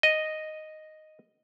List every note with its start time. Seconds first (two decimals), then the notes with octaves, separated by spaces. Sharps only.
0.03 D#5